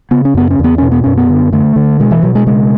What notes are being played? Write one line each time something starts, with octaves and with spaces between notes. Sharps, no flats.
C#3 B3
C#4
F#2 B3
C#4
E2
B3
B2 C#4
B3
F#2 C#4
B3
D3
D3 A3
D3
B2 G#3
E3
B2 F#3
G#3
C#3 G#3